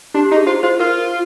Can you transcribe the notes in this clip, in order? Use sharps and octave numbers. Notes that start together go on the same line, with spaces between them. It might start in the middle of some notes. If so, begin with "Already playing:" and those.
D4 G4
G4
D#4
G#4
F4 C5
F4 C5
F4 A#4